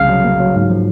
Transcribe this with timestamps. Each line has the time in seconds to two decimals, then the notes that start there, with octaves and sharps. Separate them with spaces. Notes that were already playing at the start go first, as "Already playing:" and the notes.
Already playing: C2 C#3 F5
0.09 F#3
0.24 A#3
0.40 F#3
0.55 G#2
0.70 F3